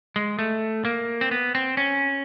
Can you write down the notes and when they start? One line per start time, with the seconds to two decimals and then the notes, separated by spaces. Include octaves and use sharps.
0.16 G#3
0.39 A3
0.85 A#3
1.21 C4
1.31 B3
1.55 C4
1.77 C#4